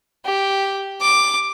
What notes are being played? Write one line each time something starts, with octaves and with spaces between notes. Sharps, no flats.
G4
D6